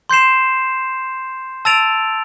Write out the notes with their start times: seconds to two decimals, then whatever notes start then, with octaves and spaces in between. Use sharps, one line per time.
0.09 C6 G6 C7 E7
1.65 A5 E6 A6 D7 F7